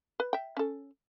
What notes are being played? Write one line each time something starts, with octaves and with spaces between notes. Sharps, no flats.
B4
E5 G5
C#4 A4